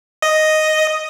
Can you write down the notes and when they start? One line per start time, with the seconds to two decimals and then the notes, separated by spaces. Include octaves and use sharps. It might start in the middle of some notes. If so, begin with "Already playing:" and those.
0.22 D#5